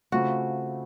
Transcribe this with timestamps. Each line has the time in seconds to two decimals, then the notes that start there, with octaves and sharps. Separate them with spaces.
0.12 C#3 A3 C4 F4 F#4